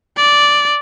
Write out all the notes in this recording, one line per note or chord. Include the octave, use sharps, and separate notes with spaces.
D5